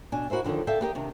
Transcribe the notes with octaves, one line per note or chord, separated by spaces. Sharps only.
B2 D4 G#5
E4 F#4 A#4 C5 E5
F2 D3 D#3 D#4 C#5
A4 D5 E5 F5 G5
B3 G4 A#4 D#5
C3 D#3 D4